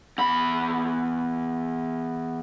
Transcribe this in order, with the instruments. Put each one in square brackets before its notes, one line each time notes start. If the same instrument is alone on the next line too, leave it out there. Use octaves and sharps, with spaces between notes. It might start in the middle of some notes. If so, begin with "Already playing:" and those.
[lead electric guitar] E2 B5